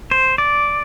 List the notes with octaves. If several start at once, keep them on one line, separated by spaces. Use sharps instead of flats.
C5
D5